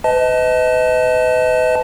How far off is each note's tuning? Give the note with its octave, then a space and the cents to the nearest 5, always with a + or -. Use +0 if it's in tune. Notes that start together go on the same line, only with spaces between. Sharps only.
B4 +40 D#5 +25 A5 +0